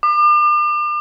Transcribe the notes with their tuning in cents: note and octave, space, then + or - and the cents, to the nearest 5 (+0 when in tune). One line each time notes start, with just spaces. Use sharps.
D6 +40